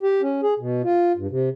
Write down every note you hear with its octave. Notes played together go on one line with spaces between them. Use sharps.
G4
C#4
G#4
B2
F4
G2
C3